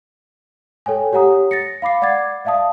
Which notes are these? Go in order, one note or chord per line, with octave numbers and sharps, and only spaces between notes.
A4 C#5 G5 G#5
G4 C#5 F#5 A#5 D#6
A6 A#6 C#7
F5 B5 D6 C7
D5 F#5 D6 G#6 A6
D5 E5 F5 A5 D#6